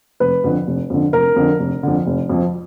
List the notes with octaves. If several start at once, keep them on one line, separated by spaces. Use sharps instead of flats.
F1 B4
F2 D3
F1
F2 D3
F1 A#4
F2 D3
F1
F2 D3
F1
F2 F3